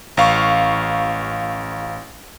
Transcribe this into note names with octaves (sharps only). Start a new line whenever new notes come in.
A1 F5 C#6